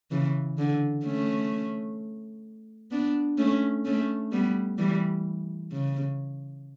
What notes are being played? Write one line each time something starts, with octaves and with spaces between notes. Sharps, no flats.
C#3 E3
D3
A3 C#4
B3 D4
A3 C#4
A3 C#4
G3 B3
E3 G3
C#3